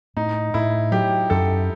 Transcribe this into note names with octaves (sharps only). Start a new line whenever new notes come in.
A2 D#4
A2 E4
F#3 G4
F#2 A4